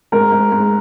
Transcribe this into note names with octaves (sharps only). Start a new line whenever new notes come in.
G#2 A#4
G#2
G#2